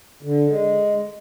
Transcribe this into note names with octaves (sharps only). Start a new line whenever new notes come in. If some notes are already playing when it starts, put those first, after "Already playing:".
D3
G#3